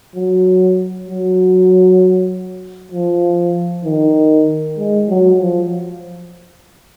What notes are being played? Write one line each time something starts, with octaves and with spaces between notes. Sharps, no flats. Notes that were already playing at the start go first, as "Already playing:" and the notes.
F#3
F#3
F3
D#3
G#3
F#3
F3